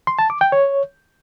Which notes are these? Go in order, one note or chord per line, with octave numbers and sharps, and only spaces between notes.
C6
A5
D6
G5
C#5